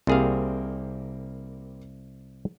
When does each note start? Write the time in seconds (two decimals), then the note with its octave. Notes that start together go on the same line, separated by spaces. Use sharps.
0.07 C2 G3 A#3 C4 G#4 F5